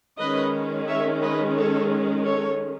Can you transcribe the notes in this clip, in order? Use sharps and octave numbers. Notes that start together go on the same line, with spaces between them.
D#3 G#3 C#4 B4 D#5
C#5 E5
B4 D#5
A4 C#5
A4 C#5